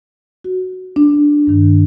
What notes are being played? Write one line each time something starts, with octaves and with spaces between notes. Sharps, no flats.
F#4
D4
G2 D#3